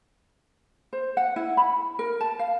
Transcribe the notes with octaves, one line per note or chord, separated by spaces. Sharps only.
C5
F#5
E4
B5
A#4
A5
F5